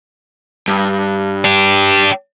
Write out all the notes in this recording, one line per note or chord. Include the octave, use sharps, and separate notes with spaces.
G2
D4 G4